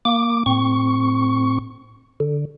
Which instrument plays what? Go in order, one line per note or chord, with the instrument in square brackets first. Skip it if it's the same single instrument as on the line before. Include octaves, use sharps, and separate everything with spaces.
[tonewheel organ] A#3 D6
A2 C4 C#6
D3